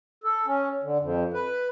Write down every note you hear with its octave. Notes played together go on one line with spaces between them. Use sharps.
A4
C#4
D3
F2
B4